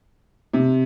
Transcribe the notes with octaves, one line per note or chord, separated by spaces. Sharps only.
C3